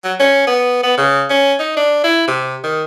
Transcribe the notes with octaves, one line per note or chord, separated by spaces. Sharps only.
F#3
C#4
B3
B3
C#3
C#4
D#4
D4
E4
C3
D#3